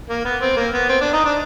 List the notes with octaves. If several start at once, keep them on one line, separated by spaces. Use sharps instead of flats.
A#3
B3
C4
A#3
B3
C4
D4
D#4
D4